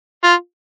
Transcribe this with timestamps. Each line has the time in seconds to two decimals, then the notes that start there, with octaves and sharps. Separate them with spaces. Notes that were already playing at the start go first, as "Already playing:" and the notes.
0.24 F4